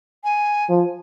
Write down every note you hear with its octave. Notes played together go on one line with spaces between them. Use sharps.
G#5
F3